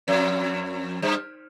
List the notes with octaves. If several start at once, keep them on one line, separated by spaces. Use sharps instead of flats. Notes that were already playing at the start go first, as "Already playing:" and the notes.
F2
G2